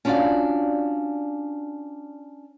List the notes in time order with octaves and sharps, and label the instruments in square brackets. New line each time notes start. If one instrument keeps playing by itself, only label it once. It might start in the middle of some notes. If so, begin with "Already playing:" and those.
[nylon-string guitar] C#4 D4 F4 F#4 D5 F5